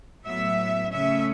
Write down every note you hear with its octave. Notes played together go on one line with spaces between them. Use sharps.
A2 F#3 B3 E5
C#3 A3 C#4 E5